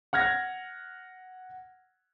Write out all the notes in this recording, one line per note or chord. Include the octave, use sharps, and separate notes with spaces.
F#5 F6 G#6 A#6